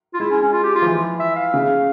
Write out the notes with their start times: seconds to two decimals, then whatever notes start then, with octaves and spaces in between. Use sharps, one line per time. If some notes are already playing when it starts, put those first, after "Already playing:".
0.14 F4
0.20 G#3 E4
0.30 C#4
0.42 C#4
0.53 F4
0.64 G4
0.75 F4
0.82 F3
0.86 E3
1.20 E5
1.36 F5
1.54 C#3